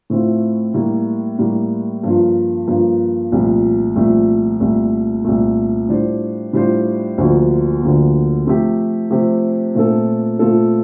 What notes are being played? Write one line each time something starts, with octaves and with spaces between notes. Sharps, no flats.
A2 A3 C4 F4
A2 G3 A#3
A2 G3 A#3
G2 F3 A#3 F4
G2 F3 A#3 F4
C2 A#2 F3 A3
C2 A#2 F3 A3
C2 A#2 A3
C2 A#2 A3
A2 G3 D4 F4 C5
A2 G3 D4 F4 C5
D2 D3 F3 A#3
D2 D3 F3 A#3
C3 F3 A3 C4 G4
C3 F3 A3 C4 G4
A#2 A3 C4 F4 A4
A#2 A3 C4 F4 A4